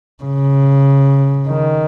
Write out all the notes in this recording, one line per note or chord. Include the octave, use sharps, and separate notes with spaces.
C#3
D#3